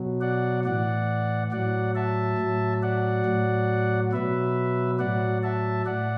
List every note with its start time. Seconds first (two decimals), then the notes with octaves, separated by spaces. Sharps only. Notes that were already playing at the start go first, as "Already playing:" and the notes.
Already playing: B2 F#3
0.21 D5 F#5
0.65 A2 E3 D5 F#5
1.52 A2 F#3 D5 F#5
1.95 E5 A5
2.38 A2 F#3
2.83 D5 F#5
3.25 A2 F#3
4.13 B2 F#3 B4 E5
4.99 A2 F#3 D5 F#5
5.43 E5 A5
5.86 A2 D5 F#5